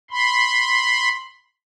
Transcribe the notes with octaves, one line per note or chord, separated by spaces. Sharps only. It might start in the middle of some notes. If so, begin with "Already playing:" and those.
B5 C6